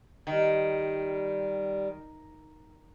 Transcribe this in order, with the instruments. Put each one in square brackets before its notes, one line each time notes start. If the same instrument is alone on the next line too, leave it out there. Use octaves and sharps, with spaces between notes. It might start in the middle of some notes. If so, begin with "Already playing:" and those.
[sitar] D#3 [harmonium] G3